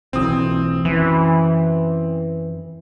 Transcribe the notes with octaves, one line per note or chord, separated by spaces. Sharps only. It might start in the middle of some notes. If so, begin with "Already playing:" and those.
B1 E3 C4 D#6
F#2 E3